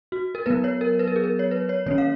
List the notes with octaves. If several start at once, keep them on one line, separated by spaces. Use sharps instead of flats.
F#4
A#4
F#3 B3 B4
C#5
A#4
B4
A#4
G#4
A#4
C#5
B4
C#5
D#3 A#3 C#4 C#5
F5